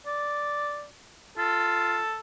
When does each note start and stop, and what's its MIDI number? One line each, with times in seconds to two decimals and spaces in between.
0.06 0.87 74
1.38 2.00 65
1.38 2.19 69